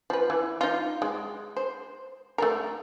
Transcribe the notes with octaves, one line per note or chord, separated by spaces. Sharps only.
F3 B4
E3
D#4 F4
G#3
C5
A3 A4 A#4